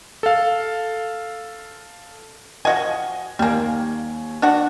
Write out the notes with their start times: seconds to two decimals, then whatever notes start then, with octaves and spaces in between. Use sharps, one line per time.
0.23 A4 F5
2.65 F3 F#4 D#5 G#5
3.39 D#2 G3 A#3 G#5
4.42 D4 F#4 F#5